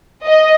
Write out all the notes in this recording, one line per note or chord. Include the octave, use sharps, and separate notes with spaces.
D#5